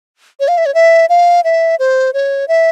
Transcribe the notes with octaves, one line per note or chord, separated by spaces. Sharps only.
C#5
F5
E5
C#5
E5
F5
E5
C5
C#5
E5